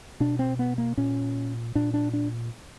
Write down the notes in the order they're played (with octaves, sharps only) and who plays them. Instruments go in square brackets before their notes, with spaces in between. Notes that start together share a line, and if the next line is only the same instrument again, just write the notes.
[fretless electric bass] B2 D4
C4
B3
A#3
A#2 C#4
A#2 D4
D4
D4